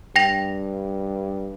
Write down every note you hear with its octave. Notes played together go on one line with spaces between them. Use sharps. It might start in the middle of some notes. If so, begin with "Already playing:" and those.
G2 G5 A#6 F7